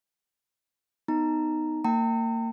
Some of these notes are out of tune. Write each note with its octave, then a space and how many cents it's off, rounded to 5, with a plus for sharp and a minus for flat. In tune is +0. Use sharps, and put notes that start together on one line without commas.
B3 +10 D#4 +0 A#5 +0
A#3 -30 G5 -10 A#5 -45